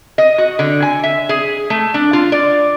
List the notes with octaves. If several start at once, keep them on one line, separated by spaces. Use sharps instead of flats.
D#5
F#4
D3
G#5
E5
G#4
A3
D4
F4
D5